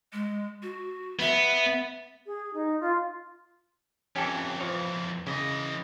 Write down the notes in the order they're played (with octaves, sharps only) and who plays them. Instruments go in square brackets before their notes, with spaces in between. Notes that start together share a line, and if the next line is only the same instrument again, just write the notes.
[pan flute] G#3
F#4
[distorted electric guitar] B3 [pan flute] E5
[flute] G#4
D#4
F4
[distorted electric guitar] F2 E3 [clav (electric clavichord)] C#4 G4 A4
[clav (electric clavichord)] F3 B4 C#5
[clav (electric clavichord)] C#3 [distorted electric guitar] E3 D#5